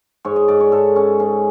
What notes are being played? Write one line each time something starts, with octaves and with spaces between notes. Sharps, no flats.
G#2 C#5
D#5
G#2 D5
C#5
G#2 A4
C#4
C#4 G#4